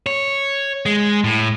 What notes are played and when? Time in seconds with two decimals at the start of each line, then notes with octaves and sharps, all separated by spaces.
0.06 C#5
0.86 G#3
1.24 A2